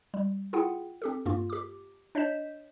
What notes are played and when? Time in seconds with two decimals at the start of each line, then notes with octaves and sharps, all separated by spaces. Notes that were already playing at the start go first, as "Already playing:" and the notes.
0.14 G3
0.53 E4 F4 G#4 F#5 G5
1.02 C4 G4 A4
1.26 G2 A#3 F4
1.50 G4 D6
2.15 D4 C#5 D#5 G6 B6 E7